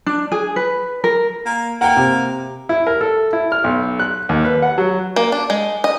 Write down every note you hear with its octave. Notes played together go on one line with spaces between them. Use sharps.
D4
G#4
B4
A#4
A#3
A#3 F#5 G5
C3
E4
A#4
A4
E4
F6
B1
F#6
D#2
B4
F#5
F#3
A#3
D4
G#3
D#5